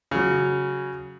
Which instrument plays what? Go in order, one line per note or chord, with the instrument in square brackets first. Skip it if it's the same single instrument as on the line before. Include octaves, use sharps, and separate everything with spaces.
[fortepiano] C#3 F#3